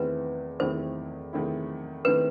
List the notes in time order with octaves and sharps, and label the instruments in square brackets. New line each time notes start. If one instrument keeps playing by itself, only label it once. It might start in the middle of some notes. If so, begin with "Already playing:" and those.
Already playing: [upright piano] E2 D#3 A3 C4 E4 [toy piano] B4
[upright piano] E2 D#3 A3 C4 E4 [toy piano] C5
[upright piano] E2 D#3 A3 C4 E4
[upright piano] D#3 A3 C4 E4 [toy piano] B4